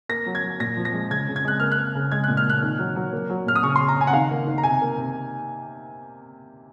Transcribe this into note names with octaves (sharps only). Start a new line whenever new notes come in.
A#3 A#6
F#3
G#6
F#3
A#2 A#6
F3
A#6
G#3
C#3 G#6
C#3
G#6
G#3 F#6
A#3 F6
F#6
A#3
C#3
G#3 G#6
A#2 F#6
F6
A#2 F#6
D#3
F#3
F#3
A#3
F#3
A#2 F6
D#6
C#3 C#6
C#3 C6
A#5
C#3 G#5
F#5
D#3 F5
A#3
D#3
A#5
C3 G#5
A#3
C3